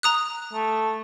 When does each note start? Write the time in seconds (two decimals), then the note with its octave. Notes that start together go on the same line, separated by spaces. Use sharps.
0.03 A#5 D#6 F#6
0.53 A3